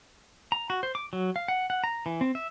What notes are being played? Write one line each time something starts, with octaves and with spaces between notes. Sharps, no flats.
A#5
F#4
C5
D6
F#3
F5
F#5
F#5
A#5
E3
C4
E5